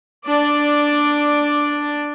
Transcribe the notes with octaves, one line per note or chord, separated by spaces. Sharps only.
D4 D5